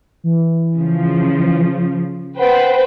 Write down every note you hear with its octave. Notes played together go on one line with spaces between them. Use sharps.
E3
C#3 F3
B4 C5 F#5 G5